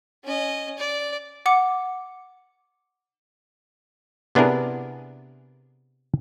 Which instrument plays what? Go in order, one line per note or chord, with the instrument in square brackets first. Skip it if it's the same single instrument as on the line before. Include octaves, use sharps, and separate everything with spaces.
[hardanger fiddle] C#4 D#5
D5
[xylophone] F#5 D6 C#7
[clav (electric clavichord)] C3 B3 D4 E4 G#4 A#4